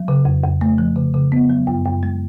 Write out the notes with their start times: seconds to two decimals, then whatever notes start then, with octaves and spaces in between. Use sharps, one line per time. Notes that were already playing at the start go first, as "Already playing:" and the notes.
Already playing: F#3
0.08 C#3
0.25 F2
0.44 F2
0.61 A3
0.78 F3
0.96 C#3
1.14 C#3
1.32 B3
1.50 F#3
1.67 F#2
1.85 F#2
2.03 G#3